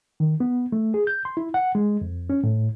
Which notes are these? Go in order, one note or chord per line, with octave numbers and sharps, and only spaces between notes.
D#3
B3
A3
G#4
G6
C6
E4
F#5
G#3
F2
C#4
A2